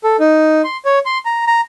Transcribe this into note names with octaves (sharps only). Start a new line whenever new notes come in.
A4
D#4
C6
C#5
C6
A#5
A#5